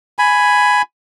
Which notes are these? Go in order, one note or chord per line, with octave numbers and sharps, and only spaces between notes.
G#5 B5